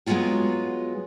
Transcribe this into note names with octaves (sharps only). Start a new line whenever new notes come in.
F#3 G#3 B3 C#4 F4 F#4